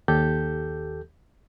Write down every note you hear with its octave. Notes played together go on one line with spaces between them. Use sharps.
D#2 G4 A4 G6